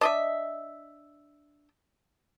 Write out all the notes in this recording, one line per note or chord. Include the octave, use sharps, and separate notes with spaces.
D4 D#5 E5